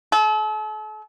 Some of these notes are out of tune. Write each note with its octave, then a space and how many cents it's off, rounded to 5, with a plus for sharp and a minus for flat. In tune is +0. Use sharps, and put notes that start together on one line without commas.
A4 -40